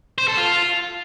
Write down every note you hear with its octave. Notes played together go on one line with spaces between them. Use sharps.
C5
A4
F4